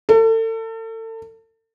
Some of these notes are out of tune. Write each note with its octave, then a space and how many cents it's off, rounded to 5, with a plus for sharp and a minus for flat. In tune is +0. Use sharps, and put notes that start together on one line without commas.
A4 +35